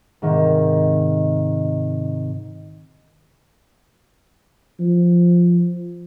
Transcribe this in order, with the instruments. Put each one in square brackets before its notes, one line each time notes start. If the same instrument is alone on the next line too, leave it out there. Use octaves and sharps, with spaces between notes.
[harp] G#2 C3 D#3
[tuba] F3